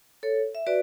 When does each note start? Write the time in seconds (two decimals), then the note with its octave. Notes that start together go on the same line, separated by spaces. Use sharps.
0.23 A4 C#5
0.55 E5
0.67 F#4 B4 D5